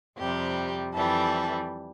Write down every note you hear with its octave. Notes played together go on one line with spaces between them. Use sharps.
F2 C3 G3 G4
F2 E3 G3 A4